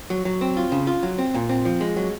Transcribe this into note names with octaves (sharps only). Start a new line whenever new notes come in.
F#3
F#3
C4
F4
C#3
F4
F#3
C4
A#2
C4
F3
G#3
F#3